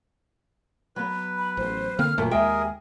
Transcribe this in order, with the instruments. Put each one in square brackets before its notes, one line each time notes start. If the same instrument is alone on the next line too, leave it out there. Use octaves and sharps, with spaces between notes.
[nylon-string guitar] F#3 B3 [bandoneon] B4
[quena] B5
[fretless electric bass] A1 [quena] C5
[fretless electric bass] D3 A#3 C4 [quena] F6
[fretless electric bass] E1 F#2 A3 [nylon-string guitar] A#2 D#3 [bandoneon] A#3 [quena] A#4
[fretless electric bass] D#2 G#3 [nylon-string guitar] G4 E5 G5 [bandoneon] G#4 A#4 [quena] G#5